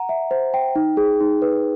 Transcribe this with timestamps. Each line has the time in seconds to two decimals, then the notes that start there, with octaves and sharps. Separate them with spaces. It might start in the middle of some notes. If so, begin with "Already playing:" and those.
Already playing: F#5 A#5
0.09 E5
0.31 C5
0.54 G5
0.76 D#4
0.97 G#4
1.20 D#4
1.42 B4